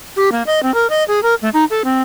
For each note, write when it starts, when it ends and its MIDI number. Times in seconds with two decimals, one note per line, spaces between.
0.16 0.32 67
0.32 0.43 58
0.46 0.62 75
0.63 0.73 60
0.74 0.87 70
0.90 1.03 75
1.08 1.20 68
1.23 1.34 70
1.42 1.49 57
1.54 1.64 63
1.70 1.82 69
1.84 2.02 60